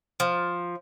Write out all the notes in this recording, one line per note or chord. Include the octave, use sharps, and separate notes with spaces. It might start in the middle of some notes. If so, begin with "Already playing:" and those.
F3